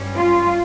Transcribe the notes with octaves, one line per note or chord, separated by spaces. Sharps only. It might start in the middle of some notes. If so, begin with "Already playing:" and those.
Already playing: G2 G3 C#4
F4